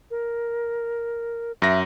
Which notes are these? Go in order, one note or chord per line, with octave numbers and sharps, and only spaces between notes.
A#4
F#2 E5 A#6